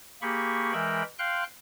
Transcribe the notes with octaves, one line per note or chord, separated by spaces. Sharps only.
A#3 G4 G#4 B5 C#6
E3 G#3 A#4 E5 G5 B5
F5 G5 C6 F#6